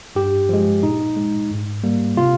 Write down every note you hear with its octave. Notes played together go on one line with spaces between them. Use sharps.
G2 G4
F3 G#3
A#2 D#4
G#3
G#2
G3 A#3
C3 F4